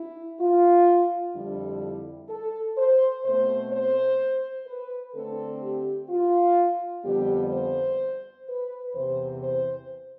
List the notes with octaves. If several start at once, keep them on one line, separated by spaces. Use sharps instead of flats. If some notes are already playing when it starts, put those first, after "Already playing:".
Already playing: E4
F4
F2 D3 G3 D4 E4
A4
C5
B2 A3 C4 C5
C5
B4
D3 A3 C4 A4
G4
F4
F2 D3 G3 B3 G4
C5
B4
E2 C3 E3 C5
C5